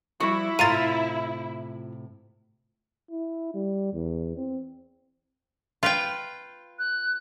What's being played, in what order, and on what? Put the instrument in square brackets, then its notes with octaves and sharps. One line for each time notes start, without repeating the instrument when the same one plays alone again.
[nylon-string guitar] F3 G3 D5 [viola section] E4 [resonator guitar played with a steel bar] F#4
[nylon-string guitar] A2 C3 [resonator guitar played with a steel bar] F4 F5 A#5 [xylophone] A6 D#7
[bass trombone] E4
G3
E2
C4
[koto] F4 B4 G5
[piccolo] F#6